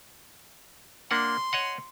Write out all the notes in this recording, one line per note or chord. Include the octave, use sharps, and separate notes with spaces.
A#3 D4 F#5 C6
C#5 D#5 F#5